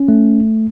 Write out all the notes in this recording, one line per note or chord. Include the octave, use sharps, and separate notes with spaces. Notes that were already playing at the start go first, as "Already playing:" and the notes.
Already playing: C#4
A3